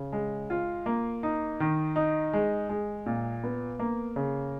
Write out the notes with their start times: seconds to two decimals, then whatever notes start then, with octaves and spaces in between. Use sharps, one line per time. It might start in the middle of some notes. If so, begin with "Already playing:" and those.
Already playing: C#3
0.12 G#3
0.50 F4
0.86 A#3
1.23 D#4
1.60 D#3
1.96 D#4
2.33 G#3
2.69 G#3
3.06 A#2
3.44 B3
3.79 A#3
4.16 C#3